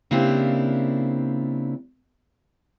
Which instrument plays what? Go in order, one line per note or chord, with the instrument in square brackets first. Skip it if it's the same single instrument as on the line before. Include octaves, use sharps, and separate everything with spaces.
[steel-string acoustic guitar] C#3 A#3 C4 D4 E4 G4